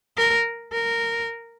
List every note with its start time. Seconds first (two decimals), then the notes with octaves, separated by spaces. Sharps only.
0.17 A#4
0.73 A#4